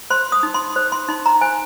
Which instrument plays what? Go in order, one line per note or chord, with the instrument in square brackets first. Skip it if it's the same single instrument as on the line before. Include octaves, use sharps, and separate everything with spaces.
[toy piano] C5 C6
D#6
D#4
C6
C5
C6
D#4 C6
A#5
C5 G#5